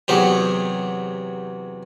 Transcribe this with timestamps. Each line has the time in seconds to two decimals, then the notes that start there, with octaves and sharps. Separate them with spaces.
0.08 E2 C3 F#3 G4 G#4